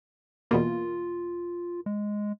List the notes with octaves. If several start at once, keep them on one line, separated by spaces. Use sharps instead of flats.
E2 B2 A#3 F4
G#3